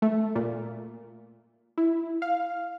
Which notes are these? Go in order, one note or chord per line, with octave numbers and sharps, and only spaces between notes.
A3
A#2
E4
F5